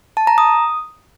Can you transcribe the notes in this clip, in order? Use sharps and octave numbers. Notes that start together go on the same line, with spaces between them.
A5
A#5
D#6